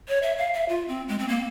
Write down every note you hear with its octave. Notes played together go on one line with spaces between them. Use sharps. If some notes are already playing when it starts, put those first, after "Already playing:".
C#5
E5
F5
E5
F4
C4
G#3
C4
A#3